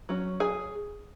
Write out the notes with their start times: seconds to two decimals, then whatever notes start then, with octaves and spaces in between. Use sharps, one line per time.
0.09 F#3 C#4
0.40 G#4 G#5